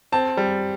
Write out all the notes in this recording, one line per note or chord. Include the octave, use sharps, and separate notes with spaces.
C4 A5
G3